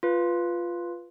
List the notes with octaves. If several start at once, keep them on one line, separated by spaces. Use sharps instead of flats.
F4 B4